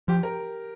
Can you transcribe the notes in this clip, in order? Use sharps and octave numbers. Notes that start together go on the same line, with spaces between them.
F3 G4
A#4